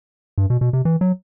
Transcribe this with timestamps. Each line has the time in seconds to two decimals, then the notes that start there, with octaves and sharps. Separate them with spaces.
0.38 G2
0.50 B2
0.61 B2
0.73 C3
0.85 E3
1.01 F#3